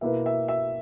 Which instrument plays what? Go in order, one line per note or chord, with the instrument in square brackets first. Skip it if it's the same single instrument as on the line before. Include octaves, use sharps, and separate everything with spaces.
[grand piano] B2 A#3 E4 B4 [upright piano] E5
[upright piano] E5
E5